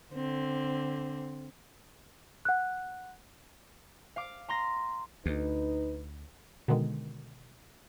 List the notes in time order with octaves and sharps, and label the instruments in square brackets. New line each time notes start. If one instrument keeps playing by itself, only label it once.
[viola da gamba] D3 C4
[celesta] F#5 F#6
[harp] F5 D6
A#5 C6 A#6
[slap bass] D2 [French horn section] D#4 B4
[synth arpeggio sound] B2 D3 D#3 G#3